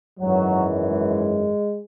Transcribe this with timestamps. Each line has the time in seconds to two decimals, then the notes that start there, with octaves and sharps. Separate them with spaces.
0.20 G#1 F#2 E3 F#3
0.87 G#3